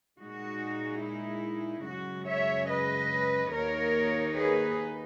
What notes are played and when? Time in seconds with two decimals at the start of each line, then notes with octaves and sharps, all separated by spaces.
0.22 A#2 G#3 D#4 F#4
1.04 E4
1.87 F#2 C#3 G#3 F#4
2.29 C#5 E5
2.70 B4 D#5
3.53 D#2 D#3 A#3 D#4 A#4 C#5
4.35 G#4 B4